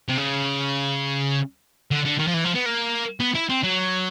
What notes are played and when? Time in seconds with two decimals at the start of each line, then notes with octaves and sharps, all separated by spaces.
0.09 C3
0.18 C#3
1.91 D3
2.05 D3
2.19 D#3
2.27 F3
2.34 E3
2.44 F3
2.55 B3
2.66 A#3
3.20 B3
3.35 E4
3.49 C4
3.63 F#3